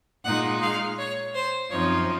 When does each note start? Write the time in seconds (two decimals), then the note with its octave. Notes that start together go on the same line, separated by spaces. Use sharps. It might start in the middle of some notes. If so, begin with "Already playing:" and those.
0.25 A#2 G#3 D#4 F#5
0.62 F5
0.98 C#5
1.34 C5
1.70 F#2 F3 C4 D#4 C#5